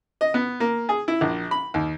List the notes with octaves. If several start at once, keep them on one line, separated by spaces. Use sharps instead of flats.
D#5
B3
A#3
G#4
E4
A#1
B5
D#2